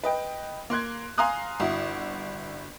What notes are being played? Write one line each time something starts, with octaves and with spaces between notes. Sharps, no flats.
B4 D#5 G5
A#3 C6 F#6 G#6
F5 G#5 A#5 C6 D#6 F#6
G1 E4 F#4